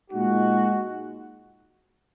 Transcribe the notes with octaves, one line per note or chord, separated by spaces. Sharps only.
A#2 G#3 D#4 F#4